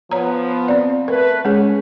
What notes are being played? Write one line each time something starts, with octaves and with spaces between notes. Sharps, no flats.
F3 B3 C#5 A#5
C4 D5
A3 A#4 B4
G#3 C#4 G#4